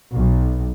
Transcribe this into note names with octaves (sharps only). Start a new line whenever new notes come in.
B1